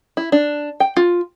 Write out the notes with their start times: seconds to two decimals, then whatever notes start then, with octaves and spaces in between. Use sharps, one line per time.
0.17 E4
0.32 D4
0.80 G5
0.97 F4